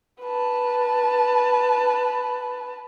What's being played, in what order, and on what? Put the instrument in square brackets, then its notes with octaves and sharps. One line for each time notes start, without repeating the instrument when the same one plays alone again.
[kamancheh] B4 A5